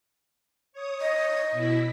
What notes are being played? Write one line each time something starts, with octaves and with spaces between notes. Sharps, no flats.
C#5 D#6
D#5
B2 E4 B6